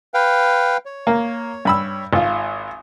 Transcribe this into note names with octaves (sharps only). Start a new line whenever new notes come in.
B4 F5 G5
C#5
A#3
G2 B5 E6
G#1 F4